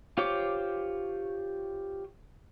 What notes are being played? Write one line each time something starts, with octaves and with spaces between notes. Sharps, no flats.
F4 G4 C5 C#5 D6